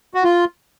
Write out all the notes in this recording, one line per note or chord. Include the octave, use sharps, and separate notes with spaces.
F#4
F4